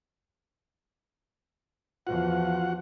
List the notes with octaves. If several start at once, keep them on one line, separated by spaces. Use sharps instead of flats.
E2 F3 F4 F#4 F#5